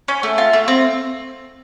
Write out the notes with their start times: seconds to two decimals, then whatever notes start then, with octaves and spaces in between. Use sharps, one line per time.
0.08 C#4
0.23 A3
0.38 F4
0.53 A3
0.68 C4